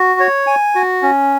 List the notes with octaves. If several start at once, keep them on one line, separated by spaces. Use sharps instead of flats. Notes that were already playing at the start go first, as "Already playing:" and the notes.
Already playing: F#4
C#5
G#5
F#4
C#4